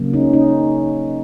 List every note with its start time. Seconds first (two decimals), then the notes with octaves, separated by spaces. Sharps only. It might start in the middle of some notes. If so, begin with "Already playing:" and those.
Already playing: C#3 F#3 A#3
0.13 C#4 D#4
0.33 C#4 D#4